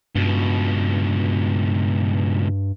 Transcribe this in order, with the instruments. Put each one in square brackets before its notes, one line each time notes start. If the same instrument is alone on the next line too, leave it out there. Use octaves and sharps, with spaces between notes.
[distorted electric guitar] C#2 B2 [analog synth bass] G2